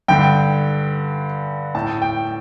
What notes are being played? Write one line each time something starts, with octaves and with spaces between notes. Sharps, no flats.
G2 D3 G5
A2 A5
G5